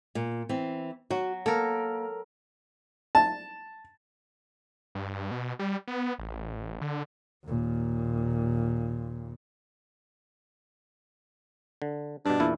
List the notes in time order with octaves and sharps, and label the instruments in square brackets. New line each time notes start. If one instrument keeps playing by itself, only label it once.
[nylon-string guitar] A#2
E3 C4
[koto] F#3 [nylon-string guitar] F#4
[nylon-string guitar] A#3 [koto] A4 A#4
[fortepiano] A5
[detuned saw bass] G2
B2
G3
B3
A1
D3
[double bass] D#2 A#2
[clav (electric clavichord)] D3
[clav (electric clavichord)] G2 B2 [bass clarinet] D4
[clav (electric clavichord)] E2 A#2 E4